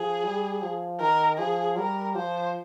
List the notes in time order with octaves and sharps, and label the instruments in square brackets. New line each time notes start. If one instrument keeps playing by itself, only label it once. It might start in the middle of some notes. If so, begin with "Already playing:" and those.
Already playing: [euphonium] F3 [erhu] G#4
[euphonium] G3
F3
[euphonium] D#3 [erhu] A#4
[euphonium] F3 [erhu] G#4
[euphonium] G3 [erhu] A#4
[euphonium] F3 [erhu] C5